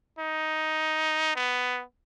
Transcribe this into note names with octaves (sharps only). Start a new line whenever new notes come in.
D#4
B3